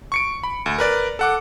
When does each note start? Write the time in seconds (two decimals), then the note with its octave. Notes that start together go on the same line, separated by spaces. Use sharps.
0.12 C#6 C#7 D7
0.43 B5
0.66 D2
0.78 A#4 B4 D5
1.19 A4 F#5 D6